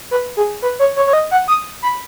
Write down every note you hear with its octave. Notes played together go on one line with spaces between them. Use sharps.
B4
G#4
B4
C#5
C#5
C#5
D#5
F#5
D#6
B5